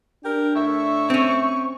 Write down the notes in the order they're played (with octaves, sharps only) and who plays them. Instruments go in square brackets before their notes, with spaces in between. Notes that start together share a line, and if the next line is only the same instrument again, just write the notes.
[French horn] D4 [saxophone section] G4 A#4
[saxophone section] A2 E4 E5 [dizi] C#6
[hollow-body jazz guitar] C4 C#4